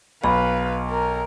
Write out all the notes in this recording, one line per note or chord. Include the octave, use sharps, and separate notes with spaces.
B1 B4 F5 B5
A#4